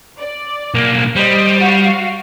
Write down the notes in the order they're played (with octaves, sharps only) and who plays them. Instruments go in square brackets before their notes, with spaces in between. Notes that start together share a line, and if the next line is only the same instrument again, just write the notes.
[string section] D5
[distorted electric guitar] B1 A#3
[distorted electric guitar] G3 [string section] C5 D#5
[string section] F#4 F5